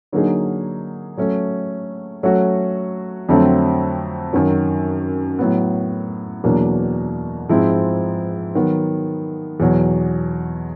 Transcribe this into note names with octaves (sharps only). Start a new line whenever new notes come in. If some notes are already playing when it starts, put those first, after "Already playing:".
D3 F#3 A#3 D#4 G#4
F#3 A3 C#4
F#3 A3 C#4 F#4
F2 D3 F#3 A3 C4
F#2 D#3 F#3
A2 F#3 B3
E2 B2 F#3 A#3 D4
G#2 F3 G#3 C4 E4
D#3 F#3 B3
E2 B2 F#3